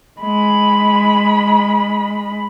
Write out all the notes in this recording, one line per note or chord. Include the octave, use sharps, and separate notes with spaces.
G#3 B5